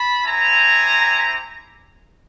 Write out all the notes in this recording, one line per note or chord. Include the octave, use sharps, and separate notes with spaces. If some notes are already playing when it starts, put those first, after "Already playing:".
Already playing: A5 B5
C4 E4 G4 G#5 A#5